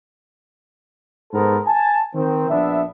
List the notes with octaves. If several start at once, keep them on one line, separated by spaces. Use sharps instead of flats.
G#2 B3 A4 A#4 C5
G#5 A5
D#3 C4
A#1 B3 D4 E5